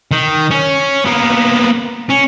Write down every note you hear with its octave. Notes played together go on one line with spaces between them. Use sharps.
D#3
C#4
A#3 B3
C#4